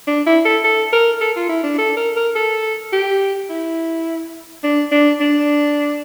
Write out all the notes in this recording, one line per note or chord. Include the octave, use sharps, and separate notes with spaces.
D4
E4
A4
A4
A#4
A4
F4
E4
D4
A4
A#4
A#4
A4
G4
E4
D4
D4
D4